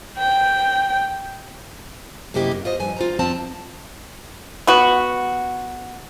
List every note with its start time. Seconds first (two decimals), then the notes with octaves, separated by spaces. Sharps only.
0.19 G5
2.34 F#2 C3 A#3 E4 G4 D#5
2.51 F#2
2.65 F4 C5 D#5
2.80 G2 F3 G#5
2.96 F4 C5 A#5
3.19 F2 F3 C4 A5
4.67 B3 F#4